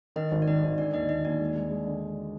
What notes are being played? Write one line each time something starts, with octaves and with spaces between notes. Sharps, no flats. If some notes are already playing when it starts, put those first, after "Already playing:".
D#3 D#4 D#5
G#1
D5
D#3 D#4 D#5
G#1
D3 D4 D5
D#2 D#4 D#5
D#2 D#4 D#5
D#2 D4 D5
G#3
G#3
G#3
D3